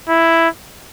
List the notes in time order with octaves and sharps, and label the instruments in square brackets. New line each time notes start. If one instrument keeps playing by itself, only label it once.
[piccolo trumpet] E4